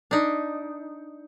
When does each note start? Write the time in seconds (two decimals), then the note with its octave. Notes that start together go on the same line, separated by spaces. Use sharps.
0.11 D4 D#4